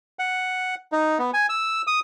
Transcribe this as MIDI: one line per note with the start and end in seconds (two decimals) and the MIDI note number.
0.19 0.75 78
0.92 1.18 63
1.19 1.31 59
1.34 1.46 80
1.49 1.82 88
1.87 2.00 87